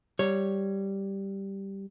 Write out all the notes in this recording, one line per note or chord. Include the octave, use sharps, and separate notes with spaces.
G3 C#5